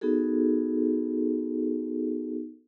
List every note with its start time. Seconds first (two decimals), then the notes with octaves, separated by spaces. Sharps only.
0.01 B3 D#4 F#4 G#4 A4